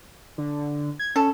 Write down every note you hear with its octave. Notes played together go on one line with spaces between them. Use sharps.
D3
G#6
C#4 A4